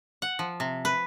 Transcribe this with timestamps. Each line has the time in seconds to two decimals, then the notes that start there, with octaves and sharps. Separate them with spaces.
0.22 F#5
0.39 F3
0.60 C3
0.85 B4